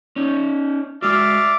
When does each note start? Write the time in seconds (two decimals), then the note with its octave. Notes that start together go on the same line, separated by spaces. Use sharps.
0.16 C#4 D#4
1.02 G#3 F#4 D5 E5 F5